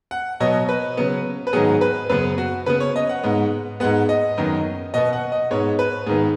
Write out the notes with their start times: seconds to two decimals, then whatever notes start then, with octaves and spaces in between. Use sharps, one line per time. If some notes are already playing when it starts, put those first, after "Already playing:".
0.11 F#5
0.40 B2 F#3 B3 D#5
0.69 B4
0.97 C#3 F#3 B3
1.47 B4
1.53 G#2 D#3 F#3 B3 G#4
1.81 B4
2.10 F#2 C#3 B3 B4
2.38 F#4
2.66 C#3 B3 B4
2.80 C#5
2.96 D#5
3.09 F#5
3.23 G#2 G#3 B3
3.80 G#2 G#3 B3 F#5
4.09 D#5
4.37 F#2 D#3 B3
4.94 B2 B3 D#5
5.13 F#5
5.32 D#5
5.50 G#2 G#3 B3 C#5
5.79 B4
6.06 G#2 D#3 B3 G#4